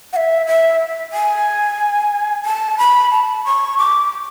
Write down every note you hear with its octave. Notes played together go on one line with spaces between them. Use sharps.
F#5
E5
E5
G#5
A5
B5
A5
C#6
D6